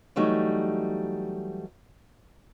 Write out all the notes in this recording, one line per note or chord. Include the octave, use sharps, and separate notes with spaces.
E3 F#3 G3 A3 D#4